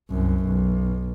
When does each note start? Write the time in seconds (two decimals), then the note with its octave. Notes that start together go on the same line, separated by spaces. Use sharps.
0.10 C2 F#2
0.45 B1